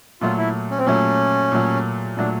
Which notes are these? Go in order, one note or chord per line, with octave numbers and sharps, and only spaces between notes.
A#2 F#3 A3 F4
E4
C#4
C4
A#2 F#3 A3 C#4
A#2 F#3 A3
A#2 F#3 A3 D4